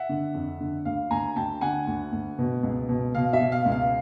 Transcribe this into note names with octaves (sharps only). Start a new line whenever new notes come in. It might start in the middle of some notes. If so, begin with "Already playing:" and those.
Already playing: E5 F#5
D3
F2
D3
D2 F5
D2 G#5 A#5
D2 G5 A5
D3 F#5 G#5
D2
D2
B2
C#2
B2
B2 F5
E5
B2
F5
C#2
F5